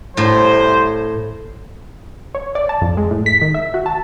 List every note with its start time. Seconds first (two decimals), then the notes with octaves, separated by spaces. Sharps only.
0.17 C2 A2 C5
2.35 C#5
2.55 D5
2.69 A5
2.81 F2
2.97 G#3
3.11 A2
3.26 B6
3.41 D#3
3.54 E5
3.74 F#4
3.86 A5